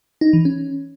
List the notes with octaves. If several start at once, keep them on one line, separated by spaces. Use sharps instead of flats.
D#4
E3
C#4